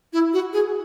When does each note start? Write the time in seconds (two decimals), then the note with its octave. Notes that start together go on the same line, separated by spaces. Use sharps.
0.13 E4
0.33 F#4
0.53 G#4